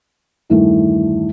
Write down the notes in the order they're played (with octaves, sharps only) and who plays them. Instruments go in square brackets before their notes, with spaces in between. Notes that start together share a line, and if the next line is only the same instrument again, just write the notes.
[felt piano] E2 G2 D#3 E3 A3